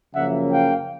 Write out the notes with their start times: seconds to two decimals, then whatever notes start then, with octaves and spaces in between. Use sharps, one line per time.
0.14 F#2 C#3 F3 A#3 E5 F#5
0.52 F5 G5